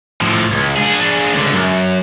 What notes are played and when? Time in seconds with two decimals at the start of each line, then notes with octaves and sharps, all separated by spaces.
0.21 A2 F3
0.52 C#2
0.77 D4 G#4
1.34 C#2 D3
1.53 F#2